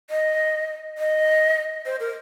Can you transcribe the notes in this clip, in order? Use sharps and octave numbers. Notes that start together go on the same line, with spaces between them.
D#5
D#5
C5
A#4